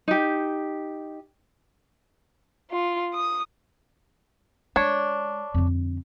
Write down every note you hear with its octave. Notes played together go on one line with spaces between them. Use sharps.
D#4 G4
F4
D#6
G#3 D4 C#5
F2 D3